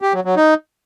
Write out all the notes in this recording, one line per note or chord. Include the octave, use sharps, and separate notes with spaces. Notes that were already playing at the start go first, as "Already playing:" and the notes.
G4
F#3
F#3
D#4